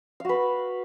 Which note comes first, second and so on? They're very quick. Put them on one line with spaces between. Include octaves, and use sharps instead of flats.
F5 F#4 B4